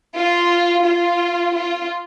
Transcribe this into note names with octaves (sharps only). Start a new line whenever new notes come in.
F4
F4
F4